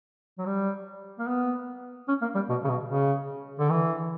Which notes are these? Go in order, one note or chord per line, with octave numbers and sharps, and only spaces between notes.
F#3
G3
A#3
B3
C#4
A#3
G3
B2
C#3
B2
C#3
D3
E3